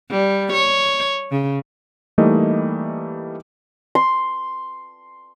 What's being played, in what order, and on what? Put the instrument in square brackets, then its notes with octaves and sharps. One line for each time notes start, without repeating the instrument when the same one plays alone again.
[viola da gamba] G3
C#5
C#3
[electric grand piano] E3 G3 A3 A#3 D#4 D#5
[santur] C6